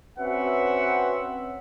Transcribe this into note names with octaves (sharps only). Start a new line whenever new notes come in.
C4 C#4 F#4 B4 E5 F#5